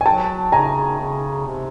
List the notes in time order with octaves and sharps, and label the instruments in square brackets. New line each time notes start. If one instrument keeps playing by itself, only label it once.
[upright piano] G#5
[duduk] F#3 [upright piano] G5 A5
[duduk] C#3 [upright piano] G#5 A#5
[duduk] C#3
C3